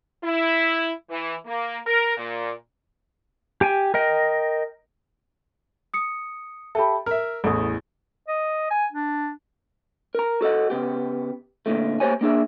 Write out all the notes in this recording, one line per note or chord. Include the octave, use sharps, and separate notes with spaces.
E4
E3
A#3
A#4
A#2
G4 G5 G#5
A#4 D#5 G5
D#6 C#7
G4 A4 E5 A5 B5
A#4 E5 F6
A1 E2 A4 D#6
D#5
G#5
D4
A#4 A#5
F#4 A4 D#5 F#5
C#3 B3 G4
D2 A#2 D3 D#3 A3
A#3 G4 C5 C#5 G#5
A#3 D4 G#4 E5